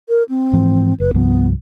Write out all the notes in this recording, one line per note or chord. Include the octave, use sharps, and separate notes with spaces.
A#4
C4
G#2 E3 F3
F#1 B4
C2 G2 F3 B3